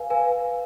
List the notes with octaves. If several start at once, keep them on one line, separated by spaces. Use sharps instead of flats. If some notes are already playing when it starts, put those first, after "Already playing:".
Already playing: B4 F5 G#5
B4 F5 G#5